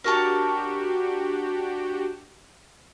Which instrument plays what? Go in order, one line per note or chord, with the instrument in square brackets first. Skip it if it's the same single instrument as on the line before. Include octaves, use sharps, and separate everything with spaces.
[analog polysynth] D4 F#4 G4 [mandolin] A#4 C#5 A5